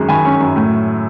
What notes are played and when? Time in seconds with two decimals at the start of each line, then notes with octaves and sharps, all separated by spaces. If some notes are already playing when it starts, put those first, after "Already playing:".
Already playing: G#1 F#2 G#3 C#4
0.09 D#3 G#5 B5
0.25 C#4
0.40 F#2
0.56 A2